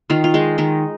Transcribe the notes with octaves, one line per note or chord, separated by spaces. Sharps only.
D#3 F4
F4
G#3 D#4
D#3 D#4